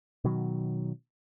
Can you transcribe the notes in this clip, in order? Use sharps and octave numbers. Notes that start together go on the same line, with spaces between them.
B2 D#3 F#3